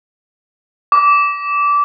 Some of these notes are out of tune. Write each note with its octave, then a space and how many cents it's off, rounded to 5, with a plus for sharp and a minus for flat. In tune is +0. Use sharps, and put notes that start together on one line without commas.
D6 -20